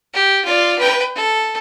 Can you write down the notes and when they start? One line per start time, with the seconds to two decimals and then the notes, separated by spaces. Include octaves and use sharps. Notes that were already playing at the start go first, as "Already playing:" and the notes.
0.14 G4
0.45 F4 D5
0.79 B4 G5
1.15 A4